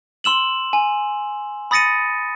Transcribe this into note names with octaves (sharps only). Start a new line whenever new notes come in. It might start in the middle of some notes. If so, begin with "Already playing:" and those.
C6 E6 E7 F#7
G#5
B5 D#6 A6 A#6 C#7 D#7